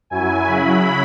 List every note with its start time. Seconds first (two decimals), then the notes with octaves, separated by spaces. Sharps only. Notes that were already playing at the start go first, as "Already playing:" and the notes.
0.10 F#2 F#3 E4 G#5
0.47 C#3 F#3 E4 B5